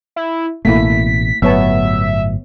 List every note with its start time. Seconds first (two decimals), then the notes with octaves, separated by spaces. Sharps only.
0.16 E4
0.65 A1 B2 A3 A#3 E4 B6
1.42 G1 A2 F#3 B3 C#5 E5 A5